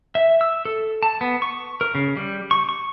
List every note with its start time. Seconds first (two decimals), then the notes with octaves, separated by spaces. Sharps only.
0.15 E5
0.41 E6
0.65 A4
1.03 A5
1.21 B3
1.42 C#6
1.81 A#4
1.95 C#3
2.17 G3
2.51 C#6
2.69 C#6